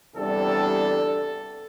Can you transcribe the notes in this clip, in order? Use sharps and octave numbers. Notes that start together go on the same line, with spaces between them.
E2 C3 G3 D4 A4